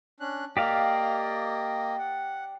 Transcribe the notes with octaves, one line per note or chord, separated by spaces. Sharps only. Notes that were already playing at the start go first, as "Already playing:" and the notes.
C#4 D4 F#6
A#3 G4 D5 D#5 F5
F#5